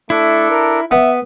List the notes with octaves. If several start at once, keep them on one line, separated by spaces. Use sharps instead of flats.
A3 D4 E4 A4
A#4
B3 E5